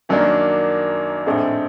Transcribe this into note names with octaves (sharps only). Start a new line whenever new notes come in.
F#2 D#3 F#3 A#3 D4
A#1 A2 A3 C4 D#4